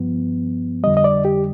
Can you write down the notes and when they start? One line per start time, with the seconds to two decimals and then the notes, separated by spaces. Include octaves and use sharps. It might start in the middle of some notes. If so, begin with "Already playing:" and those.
Already playing: G2 F3 B3
0.84 F2 D3 G3 D#5
0.97 D#5
1.04 D5
1.25 G4